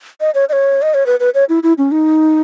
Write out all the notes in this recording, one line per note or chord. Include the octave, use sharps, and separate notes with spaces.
D#5
C#5
D#5
C#5
D#5
C#5
B4
B4
C#5
E4
E4
C#4
D#4